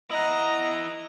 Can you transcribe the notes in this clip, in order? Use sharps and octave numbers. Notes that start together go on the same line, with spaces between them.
E4 D#5 F#5 A#5